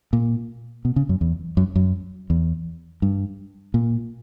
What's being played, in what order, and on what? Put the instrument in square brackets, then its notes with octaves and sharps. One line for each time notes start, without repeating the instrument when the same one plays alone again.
[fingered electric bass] A#2
B2
C#3
F#2
E2
F#2
F#2
E2
G2
A#2